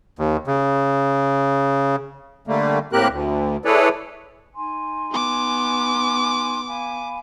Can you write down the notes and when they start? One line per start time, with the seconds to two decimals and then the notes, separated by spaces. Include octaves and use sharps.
0.19 D#2
0.47 C#3
2.47 D3 G3 A3 A#3
2.93 A2 A#3 C4 G4 A#4 F#6
3.09 D2
3.65 E4 G#4 A4 B4 C#5 D5
4.55 D#4 G#5 C6
5.11 B3 D6
6.67 F5 G#5 B5